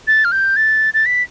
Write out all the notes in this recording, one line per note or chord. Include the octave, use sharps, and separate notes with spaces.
A6
F6
G6
A6
A6
B6